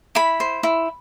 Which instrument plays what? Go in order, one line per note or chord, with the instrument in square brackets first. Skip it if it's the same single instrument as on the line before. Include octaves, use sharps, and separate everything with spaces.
[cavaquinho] E4 B5
C5
E4